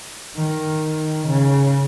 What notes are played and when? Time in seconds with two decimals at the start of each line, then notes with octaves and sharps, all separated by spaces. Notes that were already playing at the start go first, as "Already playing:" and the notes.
0.36 D#3
1.27 C#3